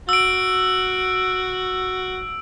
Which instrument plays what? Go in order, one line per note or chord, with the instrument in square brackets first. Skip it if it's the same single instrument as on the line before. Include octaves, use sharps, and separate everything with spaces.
[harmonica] F#4 [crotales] E6 D7